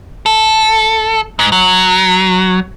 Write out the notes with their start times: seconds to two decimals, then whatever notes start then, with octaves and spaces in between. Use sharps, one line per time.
0.26 A4
1.39 G#2
1.52 F#3